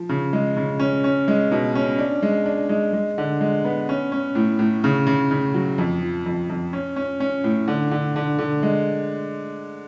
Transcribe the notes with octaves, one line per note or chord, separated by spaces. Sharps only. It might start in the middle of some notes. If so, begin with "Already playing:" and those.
Already playing: F3
C#3
G#3
C#3
C#4
C#4
G#3
B2
C#4
D4
G#3
D4
G#3
G#3
D3
G#3
B3
C#4
C#4
A2
A2
C#3
C#3
C#3
F#3
F2
F3
F2
F2
C#4
C#4
C#4
A2
D3
D3
D3
D3
G#3